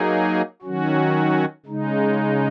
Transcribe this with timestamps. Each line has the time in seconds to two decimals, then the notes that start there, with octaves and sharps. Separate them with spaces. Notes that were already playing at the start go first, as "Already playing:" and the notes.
Already playing: F#3 A#3 D#4 G#4
0.62 D#3 F#3 C#4 F#4
1.66 C#3 G#3 D#4